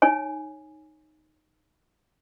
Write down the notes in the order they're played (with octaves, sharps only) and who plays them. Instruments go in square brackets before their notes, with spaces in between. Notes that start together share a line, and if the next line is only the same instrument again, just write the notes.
[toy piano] D#4 C#5 G#5